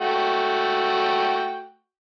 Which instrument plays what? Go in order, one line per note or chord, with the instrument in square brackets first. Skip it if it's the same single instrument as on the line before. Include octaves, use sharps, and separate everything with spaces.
[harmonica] A3 F#4 G5